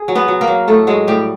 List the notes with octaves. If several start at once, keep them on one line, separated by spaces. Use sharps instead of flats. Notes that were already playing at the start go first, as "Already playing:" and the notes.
Already playing: G#4
F#3
B3 B4
F#3
A#3 A#4
F#3
A2 A3 A4
F#3 G#3 G#4
A2 G3 G4